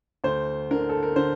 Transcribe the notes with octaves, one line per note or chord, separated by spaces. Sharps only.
D2 C5
D3 A#4
A4
A#4
D3 C5